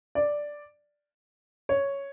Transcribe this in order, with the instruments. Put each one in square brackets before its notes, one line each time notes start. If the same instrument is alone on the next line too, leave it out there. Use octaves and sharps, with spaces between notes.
[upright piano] D5
C#5